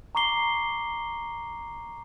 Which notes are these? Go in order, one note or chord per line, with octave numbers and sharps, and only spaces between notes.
A#5 C#6 D6 C7 G7